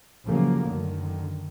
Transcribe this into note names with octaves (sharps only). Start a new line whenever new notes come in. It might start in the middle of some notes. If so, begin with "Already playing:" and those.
A#2 C#3 F3 F#3 A3 A#3
F#2 D3 D#3